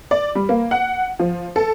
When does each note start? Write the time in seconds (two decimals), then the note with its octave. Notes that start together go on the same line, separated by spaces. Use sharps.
0.11 D5
0.35 G3
0.49 A#3
0.71 F#5
1.19 F3
1.56 A4